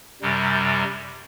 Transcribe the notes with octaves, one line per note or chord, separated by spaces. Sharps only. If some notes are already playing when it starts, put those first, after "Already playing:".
F#2 C3 G3